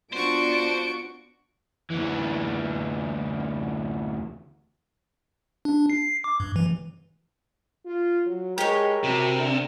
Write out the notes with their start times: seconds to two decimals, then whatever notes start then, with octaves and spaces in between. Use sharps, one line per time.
0.13 B3 D4 F4 F#4 C5 C#6 D7
1.90 D2 E3
5.65 D4
5.90 C7
6.24 D6
6.40 G2
6.56 E3
7.85 F4
8.26 F#3
8.58 G#3 G4 A#4 C#5
9.04 C3 F#4
9.36 D3